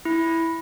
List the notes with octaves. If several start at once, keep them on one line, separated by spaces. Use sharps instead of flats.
E4